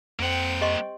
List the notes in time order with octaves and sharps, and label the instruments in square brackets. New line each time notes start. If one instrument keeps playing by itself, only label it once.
[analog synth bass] F2 [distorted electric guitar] A#3 F#5 [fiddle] C4 G5
[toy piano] G4 D#5 C6